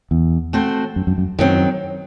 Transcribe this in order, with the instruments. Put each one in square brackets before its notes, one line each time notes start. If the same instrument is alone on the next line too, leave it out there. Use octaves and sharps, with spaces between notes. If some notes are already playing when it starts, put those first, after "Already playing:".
[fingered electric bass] E2
[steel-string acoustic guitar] A3 C4 F#4 C5
[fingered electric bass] F#2
F#2
F#2
[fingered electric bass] F#2 [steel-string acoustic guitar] D#3 F#3 C4